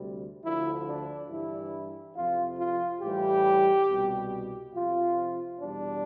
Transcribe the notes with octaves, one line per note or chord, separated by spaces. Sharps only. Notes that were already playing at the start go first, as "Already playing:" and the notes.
Already playing: D2 C3 G3
D2 D3 F3 E4
D4
G2 E3 G3 E4
F2 C3 F3 F4
F4
A2 E3 G3 G4
C2 B2 G3
F2 C3 F3 F4
E2 B2 G3 D4